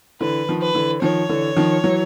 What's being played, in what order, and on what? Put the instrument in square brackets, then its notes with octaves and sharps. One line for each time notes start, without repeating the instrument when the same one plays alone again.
[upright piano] D3 E3 [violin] B4
[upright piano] D#3 F3
[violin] B4
[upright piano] D3 E3
[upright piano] D#3 F3 [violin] C#5
[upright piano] D3 E3
D#3 F3
E3 F#3